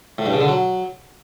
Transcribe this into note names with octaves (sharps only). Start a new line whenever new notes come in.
A2
G2
C#3
D3
F#3